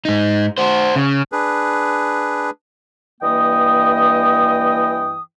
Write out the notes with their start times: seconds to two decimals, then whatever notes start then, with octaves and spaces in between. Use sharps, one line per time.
0.05 G#2 D#4
0.58 F#4 C5
0.96 C#3
1.32 D4 G#4 B4
3.21 G2 E3 A#3 D#5 G5 D#6